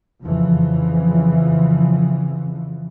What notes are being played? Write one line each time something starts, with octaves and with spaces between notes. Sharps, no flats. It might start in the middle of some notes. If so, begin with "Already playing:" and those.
F2 C#3 E3 F3